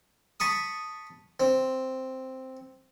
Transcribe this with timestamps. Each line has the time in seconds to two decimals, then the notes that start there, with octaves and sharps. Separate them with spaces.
0.40 A5 B5 C#6 D#6
1.40 C4